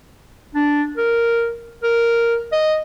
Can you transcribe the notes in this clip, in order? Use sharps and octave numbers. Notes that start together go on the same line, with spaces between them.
D4
A#4
A#4
D#5